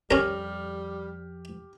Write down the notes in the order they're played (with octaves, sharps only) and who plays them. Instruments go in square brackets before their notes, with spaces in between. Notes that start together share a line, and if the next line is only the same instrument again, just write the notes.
[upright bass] F2 [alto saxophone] G3 [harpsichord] C#4 A#4 [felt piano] G4 F6